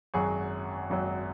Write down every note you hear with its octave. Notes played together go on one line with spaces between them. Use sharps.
G#1 F#2 F#3 G#4 C#5
G#1 F#2 F#3